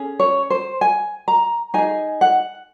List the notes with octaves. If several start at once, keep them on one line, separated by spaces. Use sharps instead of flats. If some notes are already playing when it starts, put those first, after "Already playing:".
Already playing: C#4 G#4
C#5
C5
G#5
A#5
D#4 G#4 G#5
F#5